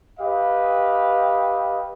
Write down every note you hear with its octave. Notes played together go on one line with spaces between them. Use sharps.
G4 B4 D#5 F5